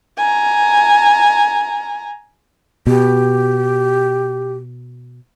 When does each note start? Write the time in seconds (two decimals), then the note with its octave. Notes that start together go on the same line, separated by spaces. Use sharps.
0.17 G#5 A#5
2.87 B2 G4